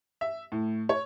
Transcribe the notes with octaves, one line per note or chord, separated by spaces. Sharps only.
E5
A2
C#5